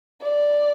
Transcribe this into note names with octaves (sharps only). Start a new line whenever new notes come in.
D5